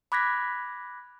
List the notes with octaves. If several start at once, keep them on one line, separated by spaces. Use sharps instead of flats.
B5 D6 F#6 G#6 A#6 B6